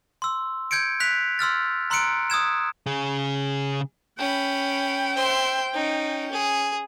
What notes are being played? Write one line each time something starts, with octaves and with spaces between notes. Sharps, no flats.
C6 E6
G6 G#6 C#7 D7
F#6 B6 F7
C6 E6 F6 A6
A#5 C6 E6 F#6 C#7 D7
D#6 E6 G#6 E7
C#3 G#4
C#4 G5 B5
C5 E5 C6
C#4 D#4
G#4